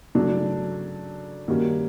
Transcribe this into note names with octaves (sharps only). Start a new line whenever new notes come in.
C#3 F#3 A3 D4
D#3 G3 A#3 C#4 F#4